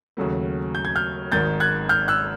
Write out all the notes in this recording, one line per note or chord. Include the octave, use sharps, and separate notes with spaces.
D#2 C#3 F#3 A3
G6
G#6
F6 G6
G#1 G#2 D#3 G6 A6
F#6 G#6
F6 G6
E6 F#6